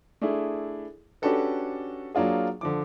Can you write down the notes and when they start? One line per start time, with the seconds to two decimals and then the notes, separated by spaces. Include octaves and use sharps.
0.22 A3 D4 E4 G#4
1.22 C#4 D4 F#4 G4 A4 B4
2.15 F#3 A#3 D4 F4 G#4
2.61 D3 F3 D6